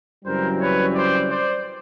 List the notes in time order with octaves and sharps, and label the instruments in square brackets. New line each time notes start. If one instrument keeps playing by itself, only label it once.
[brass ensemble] F#2 C#3 E3 G3 C4 A#4 C5
B4 C#5
C5 D5
C5 D5